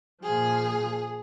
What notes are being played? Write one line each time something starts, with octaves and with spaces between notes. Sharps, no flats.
A#2 F3 G#4